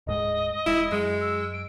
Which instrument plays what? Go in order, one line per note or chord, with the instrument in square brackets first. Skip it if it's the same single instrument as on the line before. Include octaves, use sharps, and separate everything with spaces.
[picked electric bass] D1 G#2 G#3 [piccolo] D#5
[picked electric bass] E1 G#3 [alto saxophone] E4
[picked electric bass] F#2 F#3 [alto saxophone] G#3
[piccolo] E6
D7